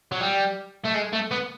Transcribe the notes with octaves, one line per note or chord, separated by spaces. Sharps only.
F#3
G3
A3
G#3
A3
B3